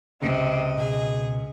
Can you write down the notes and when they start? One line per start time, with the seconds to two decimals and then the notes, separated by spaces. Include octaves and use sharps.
0.22 C#2 C3 D#5
0.78 B2 G#4